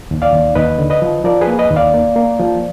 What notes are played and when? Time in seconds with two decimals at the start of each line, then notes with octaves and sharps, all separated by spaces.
0.11 D#2
0.22 D5 F5
0.33 D#2
0.55 D#2 B4 D#5
0.78 D3
0.90 B4 D#5
1.02 F3
1.24 F3 A#4 D5
1.41 G#4 B4
1.48 A#3
1.59 B4 D#5
1.70 D#2
1.76 D5 F5
1.94 A#3
2.16 A#3
2.39 F3